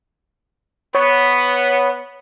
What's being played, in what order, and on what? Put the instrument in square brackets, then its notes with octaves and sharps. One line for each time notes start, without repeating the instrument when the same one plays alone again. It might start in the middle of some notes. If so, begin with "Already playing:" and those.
[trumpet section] B3 [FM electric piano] C#5